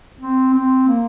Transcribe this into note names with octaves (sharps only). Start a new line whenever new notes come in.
C4
C4
A#3